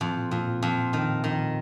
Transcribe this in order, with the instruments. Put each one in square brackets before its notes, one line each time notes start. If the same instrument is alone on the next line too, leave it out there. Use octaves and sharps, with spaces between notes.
[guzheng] F2 [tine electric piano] A2
[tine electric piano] A#2
[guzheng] F2 [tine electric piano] A#2
[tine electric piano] A2
[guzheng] F2
D#3
D#3